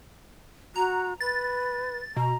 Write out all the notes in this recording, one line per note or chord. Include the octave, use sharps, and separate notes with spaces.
F#4 A#5
B4 A6
B2 A#5